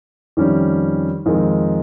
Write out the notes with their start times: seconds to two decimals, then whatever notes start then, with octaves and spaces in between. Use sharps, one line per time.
0.37 F2 D#3 G3 C#4
1.26 F2 D#3 G#3 D#4 A#4